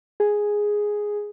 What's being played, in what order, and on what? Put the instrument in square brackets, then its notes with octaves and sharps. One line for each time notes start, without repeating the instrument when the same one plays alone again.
[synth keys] G#4